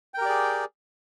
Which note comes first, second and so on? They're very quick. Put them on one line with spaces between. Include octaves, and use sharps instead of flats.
G5 A#4 G4 D5 G#4